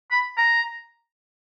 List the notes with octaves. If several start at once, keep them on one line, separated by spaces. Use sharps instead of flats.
B5
A#5